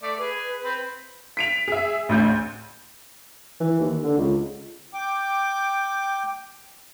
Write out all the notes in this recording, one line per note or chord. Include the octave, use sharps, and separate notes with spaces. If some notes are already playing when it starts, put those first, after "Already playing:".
A3 D5
G#4 B4
C4 B4
B6 D7 F7
G#4 E5
A1 D2 G6
E3
D#2
D3
C#2
G5 D6